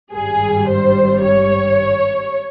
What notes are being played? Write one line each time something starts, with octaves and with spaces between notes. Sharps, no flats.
G#1 G2 G3 G#4
C5
C#5